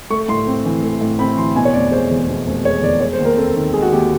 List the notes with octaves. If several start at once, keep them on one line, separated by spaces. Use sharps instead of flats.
A3 C#6
A2 C6
C4
E3
A3
A2
C4 B5
E3 C6
B2 G#5
C#5
F1 D5
G#3 C5
E2
B2
F1
G#3 C#5
E2 D5
G#3 C#5
C5
D#2
A#4
C4 A4
D#3
G#3 G#4
F#4
D#2 G4